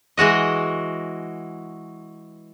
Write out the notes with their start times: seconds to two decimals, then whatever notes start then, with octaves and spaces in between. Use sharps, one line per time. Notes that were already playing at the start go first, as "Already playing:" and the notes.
0.17 E3 G#3 F#4 D#5